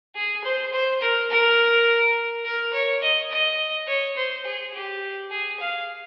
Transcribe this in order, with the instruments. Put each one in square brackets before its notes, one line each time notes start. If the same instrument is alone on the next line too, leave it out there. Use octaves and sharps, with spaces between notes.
[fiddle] G#4
C5
C5
A#4
A#4
A#4
C#5
D#5
D#5
C#5
C5
G#4
G4
G#4
F5